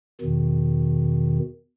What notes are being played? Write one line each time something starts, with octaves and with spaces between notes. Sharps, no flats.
E2 B2 D#3